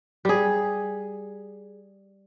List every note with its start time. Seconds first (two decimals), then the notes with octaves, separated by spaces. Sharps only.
0.25 G3 G#4